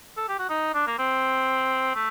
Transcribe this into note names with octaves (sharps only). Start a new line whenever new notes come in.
A4
G4
F#4
D#4
D4
A#3
C4
A3